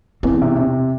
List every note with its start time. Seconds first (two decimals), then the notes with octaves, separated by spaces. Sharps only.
0.23 E2 C4
0.42 C3
0.59 C3